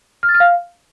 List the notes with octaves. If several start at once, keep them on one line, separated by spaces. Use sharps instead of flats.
F6
A6
F6
F5